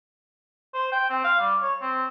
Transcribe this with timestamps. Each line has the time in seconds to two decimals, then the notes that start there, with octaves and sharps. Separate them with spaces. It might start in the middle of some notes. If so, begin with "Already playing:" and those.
0.74 C5
0.92 G5
1.10 C4
1.24 F5
1.40 G3
1.62 C#5
1.82 C4